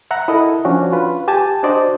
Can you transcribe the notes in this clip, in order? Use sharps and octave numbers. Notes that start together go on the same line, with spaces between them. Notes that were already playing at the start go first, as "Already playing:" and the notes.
E5 F#5 A#5
E4 A4 A#4 D#5
F3 C#4 D4 F#4
F4 B4
G4 G#5 A5
D4 F#4 C5 D5 D#5